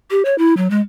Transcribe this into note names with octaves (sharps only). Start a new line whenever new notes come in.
G4
C#5
E4
F#3
G#3